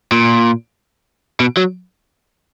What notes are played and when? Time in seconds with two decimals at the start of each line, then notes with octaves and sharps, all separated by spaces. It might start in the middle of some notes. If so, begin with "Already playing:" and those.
0.12 A#2
1.40 B2
1.57 F#3